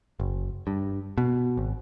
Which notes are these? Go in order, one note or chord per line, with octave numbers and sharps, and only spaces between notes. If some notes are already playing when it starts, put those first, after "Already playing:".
F#1
G2
B2
G#1